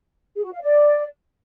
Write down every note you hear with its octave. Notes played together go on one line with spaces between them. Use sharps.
G#4
F#4
F5
D5